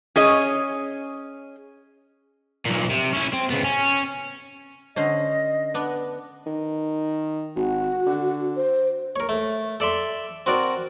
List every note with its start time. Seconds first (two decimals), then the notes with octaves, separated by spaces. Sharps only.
0.16 C#4 G#4 C#5 D#5
2.66 B1 A#2
2.90 C3
3.13 C#4 E4
3.33 C4
3.50 C#3 B3
3.64 C#4
4.96 D3 C#4 C5 D#5
5.74 B3 D4
6.46 D#3
7.56 G#1 F#4
8.07 D3
8.56 C5
9.16 A#4 C#5
9.29 A3
9.80 A4 D5 E5 C6
10.46 C4 F#4 A#4 D5